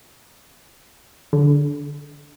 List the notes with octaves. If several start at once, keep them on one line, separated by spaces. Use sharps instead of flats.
D3